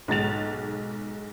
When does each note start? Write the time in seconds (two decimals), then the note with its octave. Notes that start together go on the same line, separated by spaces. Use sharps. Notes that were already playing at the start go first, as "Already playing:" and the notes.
0.08 B1 G#2 A6 F7